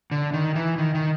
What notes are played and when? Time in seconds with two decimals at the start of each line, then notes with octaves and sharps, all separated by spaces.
0.11 D3
0.33 D#3
0.55 E3
0.78 D#3
0.95 D#3